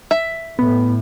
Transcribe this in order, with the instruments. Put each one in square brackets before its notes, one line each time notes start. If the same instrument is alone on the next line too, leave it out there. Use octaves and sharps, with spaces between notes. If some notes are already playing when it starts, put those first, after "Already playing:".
[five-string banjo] E5
[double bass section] A2 [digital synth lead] B3